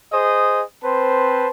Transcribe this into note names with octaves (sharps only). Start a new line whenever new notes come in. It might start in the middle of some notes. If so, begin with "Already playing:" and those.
G#4 C5 D#5 D#6
C4 B4 C5 A5